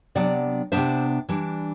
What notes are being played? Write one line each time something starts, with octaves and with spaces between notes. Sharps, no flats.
C3 F#3 B3 D4 D5 F#5
C3 F#3 B3 D4 C5 E5
E3 G3 D4